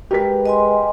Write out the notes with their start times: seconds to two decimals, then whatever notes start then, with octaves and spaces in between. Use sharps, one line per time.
0.11 G#3 G4 A#4 B4 B6
0.46 D#5 G#5 C6